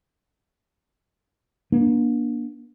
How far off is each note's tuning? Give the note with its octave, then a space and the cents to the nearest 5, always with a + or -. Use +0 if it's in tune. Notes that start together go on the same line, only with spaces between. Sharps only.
A#3 +40 D4 +0